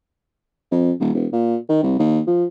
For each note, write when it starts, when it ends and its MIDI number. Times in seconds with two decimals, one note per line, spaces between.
0.72 0.92 41
1.00 1.10 27
1.15 1.26 28
1.33 1.56 46
1.69 1.82 51
1.83 1.96 36
1.99 2.21 39
2.27 2.45 53